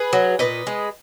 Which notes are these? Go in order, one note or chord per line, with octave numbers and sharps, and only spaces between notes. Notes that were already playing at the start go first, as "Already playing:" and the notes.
Already playing: G#4 B4
F#3
A#2 B4 D#5
G#3